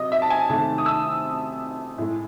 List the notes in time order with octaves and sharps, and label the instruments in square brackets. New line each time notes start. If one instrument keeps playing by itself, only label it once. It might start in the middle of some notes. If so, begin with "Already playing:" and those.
Already playing: [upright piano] C3 F#3 D#5
E5
A5
G#5
C3 D#3 A3 A5
D#6
E6
A2 G#3